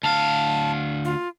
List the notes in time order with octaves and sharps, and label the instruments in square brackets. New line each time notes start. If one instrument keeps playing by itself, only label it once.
[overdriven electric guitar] D2 F5 [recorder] A5
[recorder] F4